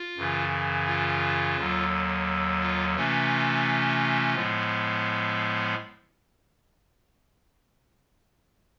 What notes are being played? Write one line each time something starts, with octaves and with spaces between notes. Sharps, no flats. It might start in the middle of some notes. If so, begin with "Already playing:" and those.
Already playing: F4
F#2 C#3 E3
F4
D#2 D3 F#3
F4
C3 E3 A3 C#4 F4
A2 F3 G#3 B3